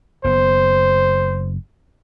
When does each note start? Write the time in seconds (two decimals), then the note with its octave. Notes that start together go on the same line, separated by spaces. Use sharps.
0.24 F#1 B3 C5